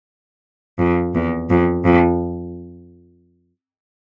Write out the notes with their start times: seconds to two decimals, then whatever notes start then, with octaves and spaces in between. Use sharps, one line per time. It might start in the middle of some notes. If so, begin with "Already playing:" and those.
0.79 F2
1.15 E2
1.50 F2
1.85 F2